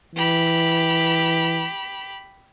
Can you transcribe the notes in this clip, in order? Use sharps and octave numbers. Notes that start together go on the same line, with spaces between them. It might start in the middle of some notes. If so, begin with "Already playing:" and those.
E3 G4 B5